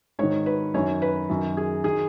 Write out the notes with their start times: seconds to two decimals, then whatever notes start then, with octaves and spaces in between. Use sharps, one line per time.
0.19 G#2 D#3 C#5
0.46 B4
0.74 F#2 D#3 C#5
1.02 B4
1.29 F#2 D#3
1.57 G#4
1.84 D#3 G#4